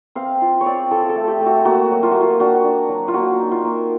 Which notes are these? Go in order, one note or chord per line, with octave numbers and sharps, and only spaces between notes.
C4 F5
F4
C#5
C4 D5
F4 A4
A4
A3
G4
A3
F#4
A#3 F#4
F#3
F4
A#3 F#4
F4
D4 F#4
D4
F#3
F4
A#3 F#4
D#4
F4
A#3